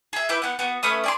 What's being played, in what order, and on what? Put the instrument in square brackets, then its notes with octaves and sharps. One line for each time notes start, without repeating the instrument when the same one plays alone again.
[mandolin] G#4 E5
E4 B4 D6 G6
B3 F#5
B3 F#4
A3 C#4 B4 D#6
D5 G#5 C6